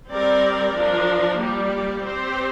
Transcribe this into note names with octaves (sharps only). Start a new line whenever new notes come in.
G3 C4 A#4 D5
F3 D4 A#4
G3 A#3 G4 D5
C4 G4 C5